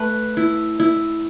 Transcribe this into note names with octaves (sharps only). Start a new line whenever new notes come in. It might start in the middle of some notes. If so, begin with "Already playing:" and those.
Already playing: A3 B4
E4
E4